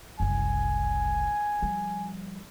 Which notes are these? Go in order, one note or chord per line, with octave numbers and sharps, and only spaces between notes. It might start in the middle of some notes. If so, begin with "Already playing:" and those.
F#1 C2 G#5
F3 G3